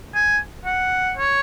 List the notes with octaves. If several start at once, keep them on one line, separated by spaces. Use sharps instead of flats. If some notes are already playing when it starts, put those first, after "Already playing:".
G#5
F#5
C#5